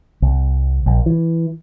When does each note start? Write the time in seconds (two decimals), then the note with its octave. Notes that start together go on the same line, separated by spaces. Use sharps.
0.22 C2
0.86 A#1
1.06 E3